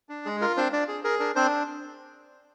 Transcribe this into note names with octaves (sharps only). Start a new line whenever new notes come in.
D4
G#3 G#4
F4 A#4
C4 D4 C5
D4 D5
G#4
G#4 A#4
D4 A#4
C4 D4 C5